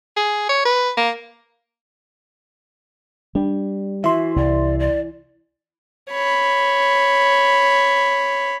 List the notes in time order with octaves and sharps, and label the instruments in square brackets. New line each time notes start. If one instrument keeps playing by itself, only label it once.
[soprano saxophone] G#4
C#5
B4
A#3
[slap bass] G3 [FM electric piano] D4
[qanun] E3 [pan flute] F#4 [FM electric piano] E5 C6
[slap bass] C2 [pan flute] D5
[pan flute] D5
[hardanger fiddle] C#5 B5